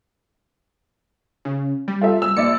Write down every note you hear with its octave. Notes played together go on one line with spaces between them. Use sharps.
C#3
G3
F4 A4 E5
E6
A#1 D5 E5 C#7